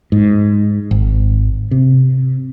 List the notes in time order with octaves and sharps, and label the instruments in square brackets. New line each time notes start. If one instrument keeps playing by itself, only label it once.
[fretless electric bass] G#2
G#1
C3